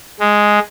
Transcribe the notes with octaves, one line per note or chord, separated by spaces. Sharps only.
G#3